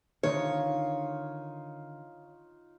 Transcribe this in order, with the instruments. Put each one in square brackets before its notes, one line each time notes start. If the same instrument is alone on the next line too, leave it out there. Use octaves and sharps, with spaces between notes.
[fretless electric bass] D3 D#3 [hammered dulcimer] D#4 F4 F5 [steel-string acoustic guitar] C#5